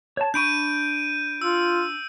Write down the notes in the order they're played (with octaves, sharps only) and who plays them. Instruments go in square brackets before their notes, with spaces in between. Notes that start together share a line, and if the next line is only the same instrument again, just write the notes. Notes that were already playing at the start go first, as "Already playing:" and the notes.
[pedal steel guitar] C#5 A5
[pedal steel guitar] D4 B5 C#6 [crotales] G6 D7 D#7
[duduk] F4 [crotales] E6